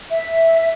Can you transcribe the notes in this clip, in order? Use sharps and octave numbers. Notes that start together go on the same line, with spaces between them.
E5